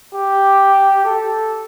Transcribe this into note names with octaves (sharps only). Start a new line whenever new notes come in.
G4
A4